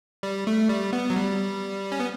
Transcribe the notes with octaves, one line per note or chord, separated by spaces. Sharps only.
G3
A3
G3
B3
F#3
G3
C#4
B3